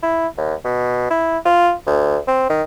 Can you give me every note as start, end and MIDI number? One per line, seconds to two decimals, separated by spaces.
0.03 0.27 64
0.37 0.54 39
0.64 1.06 47
1.10 1.38 64
1.45 1.73 65
1.86 2.18 38
2.27 2.48 60
2.49 2.63 51